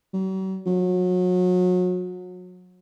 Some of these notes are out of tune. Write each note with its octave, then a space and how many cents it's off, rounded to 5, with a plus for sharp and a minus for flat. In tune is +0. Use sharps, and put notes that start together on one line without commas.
F#3 +45
F#3 -30